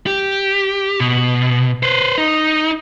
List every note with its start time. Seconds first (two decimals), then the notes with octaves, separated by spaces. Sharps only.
0.06 G4
1.00 B2
1.83 B4 C5
2.18 D#4